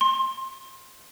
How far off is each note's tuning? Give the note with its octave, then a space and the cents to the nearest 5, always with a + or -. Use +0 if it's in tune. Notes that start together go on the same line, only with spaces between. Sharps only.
C6 +25